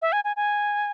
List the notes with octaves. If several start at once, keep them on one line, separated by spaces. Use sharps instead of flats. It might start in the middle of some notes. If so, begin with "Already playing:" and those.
E5
G#5
G#5
G#5